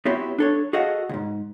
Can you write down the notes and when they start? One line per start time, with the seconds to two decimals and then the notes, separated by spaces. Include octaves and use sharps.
0.05 B3 C4 E4 F#4 G4 C#5
0.38 D4 A4 C#5
0.73 F#4 G#4 A4 D#5 F5 F#5
1.09 C#2 G#2